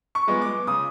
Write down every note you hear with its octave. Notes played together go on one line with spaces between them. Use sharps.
C#6
F3 G#3 B3
D6
C#3 D#6